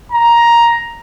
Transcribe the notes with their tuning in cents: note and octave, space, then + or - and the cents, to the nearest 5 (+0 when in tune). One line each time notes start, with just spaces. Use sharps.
A#5 +10